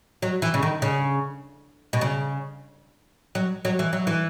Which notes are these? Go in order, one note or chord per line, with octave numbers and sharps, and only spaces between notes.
F#3
E3
C#3
D#3
C#3
B2
C#3
F#3
F#3
E3
F#3
E3